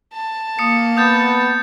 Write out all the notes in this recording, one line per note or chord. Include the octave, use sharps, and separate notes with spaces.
A5
A#3 D#6 C#7
B3 D#6 G6 A6